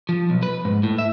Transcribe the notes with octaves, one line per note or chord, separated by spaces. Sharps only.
F3
B1
B4
G#2
A2
E5